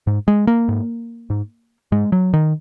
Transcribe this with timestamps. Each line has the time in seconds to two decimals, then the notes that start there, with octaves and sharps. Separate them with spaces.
0.07 G#2
0.28 G#3
0.47 A#3
0.68 G#2
1.30 G#2
1.92 G#2 G#3
2.12 F#3
2.33 D#3